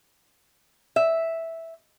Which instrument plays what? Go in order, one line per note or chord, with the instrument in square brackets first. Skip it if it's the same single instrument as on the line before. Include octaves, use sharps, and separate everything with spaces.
[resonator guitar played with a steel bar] E5